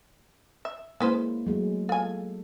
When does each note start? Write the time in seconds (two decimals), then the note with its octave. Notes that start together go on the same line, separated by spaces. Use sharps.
0.65 E5
1.00 G#3 A#3 C#4 E4 B4 C5
1.47 F#3 G#3 A3
1.89 F4 A4 G#5